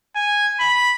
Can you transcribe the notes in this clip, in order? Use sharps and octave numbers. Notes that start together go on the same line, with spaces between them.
G#5
B5